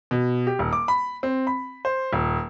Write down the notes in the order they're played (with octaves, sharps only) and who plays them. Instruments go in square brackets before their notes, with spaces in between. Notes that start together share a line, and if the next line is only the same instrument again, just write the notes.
[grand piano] B2
G4
D#1
D6
B5
C4
B5
C5
D#1